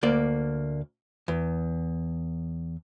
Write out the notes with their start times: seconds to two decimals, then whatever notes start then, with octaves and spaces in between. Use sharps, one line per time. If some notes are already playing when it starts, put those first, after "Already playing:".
0.03 D2 A#3 D5
1.28 E2